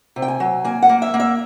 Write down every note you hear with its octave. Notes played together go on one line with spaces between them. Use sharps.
C3
G5
G#5
F#3
A#3 G#5
F#5
A#3
E5
A#3
E5